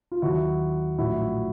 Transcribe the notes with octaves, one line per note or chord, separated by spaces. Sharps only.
F4
D#2 D#3 F#3 E4 F#4
A#1 A2 F#3 E4 F#4